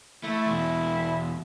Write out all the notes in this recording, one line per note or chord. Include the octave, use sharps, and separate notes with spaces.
A3 E4
E2 B2